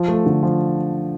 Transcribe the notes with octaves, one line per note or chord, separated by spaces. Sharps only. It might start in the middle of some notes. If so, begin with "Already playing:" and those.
Already playing: F3
A3
D3
F3